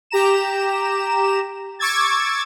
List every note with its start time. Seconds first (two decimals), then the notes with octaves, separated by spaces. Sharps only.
0.10 G4 A#5 E7
1.79 C#6 D6 E6 G#6 A6